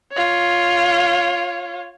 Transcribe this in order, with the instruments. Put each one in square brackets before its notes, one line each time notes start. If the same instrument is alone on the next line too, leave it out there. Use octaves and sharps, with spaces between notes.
[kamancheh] F4 C#5